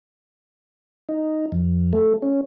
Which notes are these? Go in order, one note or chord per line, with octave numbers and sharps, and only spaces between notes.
D#4
F2
A3
C#4